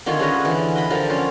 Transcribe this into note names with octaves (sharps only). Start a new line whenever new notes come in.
D3 D#3 F4 C#5
C#4 G#4 B4 D#5
D3 E3
D#5 B5
D3 F3 A#4 G5
C#4 F4 F5